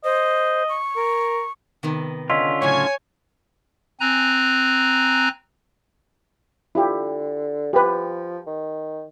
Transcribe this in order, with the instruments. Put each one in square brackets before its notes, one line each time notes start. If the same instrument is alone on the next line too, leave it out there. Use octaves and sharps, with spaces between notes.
[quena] C5 [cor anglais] D#5
[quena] C#6
[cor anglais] A#4
[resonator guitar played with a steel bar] C3 D#3 B3
[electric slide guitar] D3 C#4 F4 [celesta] D#5 E6 B6
[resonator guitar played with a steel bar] A2 C#3 F#3 [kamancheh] C#5 G#5 [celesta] C#6
[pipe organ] C4 G#5 A#5 F#6
[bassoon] D3 [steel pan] E4 F4 G4
[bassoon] F3 [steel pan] G4 B4
[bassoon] D#3